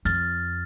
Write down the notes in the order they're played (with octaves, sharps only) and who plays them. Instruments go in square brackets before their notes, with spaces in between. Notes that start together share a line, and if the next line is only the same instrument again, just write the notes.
[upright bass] F2 [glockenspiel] F6 A6